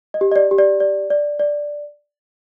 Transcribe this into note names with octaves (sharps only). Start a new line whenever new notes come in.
D#5
G4
D#5
D5
G4
D5
D5
D5
D5